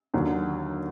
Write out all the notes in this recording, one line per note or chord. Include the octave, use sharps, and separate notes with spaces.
D#2 D3 F#3